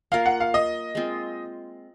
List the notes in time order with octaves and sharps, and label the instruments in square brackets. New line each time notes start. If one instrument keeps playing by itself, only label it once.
[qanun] A#3 F4 A#4 [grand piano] F5
[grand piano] F#5
F5
D#5
[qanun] G#3 C4 F4